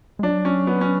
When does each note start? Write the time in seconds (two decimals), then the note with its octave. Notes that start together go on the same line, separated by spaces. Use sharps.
0.19 G#3
0.23 F#3 D4
0.45 C#4
0.67 B3
0.81 C#4